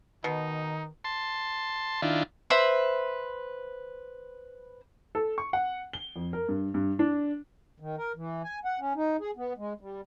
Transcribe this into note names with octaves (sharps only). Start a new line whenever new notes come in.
B2 D#3 D#4
A5 C6
D#3 D4 E4 F4
B4 C5 E5 B5
A4
C#6
F#5
G7
F2
A#4
G2
G2
D4
D#3
A#4
E3
G#5
F#5
C#4
D#4
G#4
B3
G#3
G3